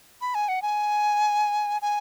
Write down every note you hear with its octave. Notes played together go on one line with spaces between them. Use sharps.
B5
G#5
F#5
G#5
G#5